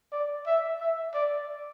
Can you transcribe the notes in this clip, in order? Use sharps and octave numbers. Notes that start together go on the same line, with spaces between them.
D5
E5
E5
D5